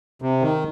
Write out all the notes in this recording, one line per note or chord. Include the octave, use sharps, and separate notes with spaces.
C3
D#3